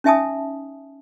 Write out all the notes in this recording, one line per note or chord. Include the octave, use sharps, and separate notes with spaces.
C#4 D#4 E5 G#5 A5 D#6